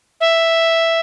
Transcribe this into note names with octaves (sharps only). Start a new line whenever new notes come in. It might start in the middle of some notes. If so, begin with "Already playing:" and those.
E5